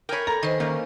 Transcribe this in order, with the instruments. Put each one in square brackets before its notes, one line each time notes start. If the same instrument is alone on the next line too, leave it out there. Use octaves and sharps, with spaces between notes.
[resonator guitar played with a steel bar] A#4 C#5 [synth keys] G5 G#5 B5
[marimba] A4 [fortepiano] A#5
[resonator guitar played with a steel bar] D#3 [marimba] B4 C5 D#5
[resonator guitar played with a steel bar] D#3 [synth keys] A#3 C#4 D#4